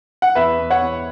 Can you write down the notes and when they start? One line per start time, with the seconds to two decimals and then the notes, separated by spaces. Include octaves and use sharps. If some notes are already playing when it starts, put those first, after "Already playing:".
0.22 F#5
0.35 E2 B4 E5
0.59 E2
0.70 C#5 F#5
0.82 E2